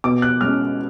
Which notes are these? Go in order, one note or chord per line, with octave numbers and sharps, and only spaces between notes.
B2 D6
F#6
G#3 C#4 F6